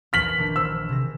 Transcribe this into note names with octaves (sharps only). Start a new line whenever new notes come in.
A#1 E3 F6 B6 C7 F#7
A#1 D#3 D4
C5 E6
C3 G#4 A#6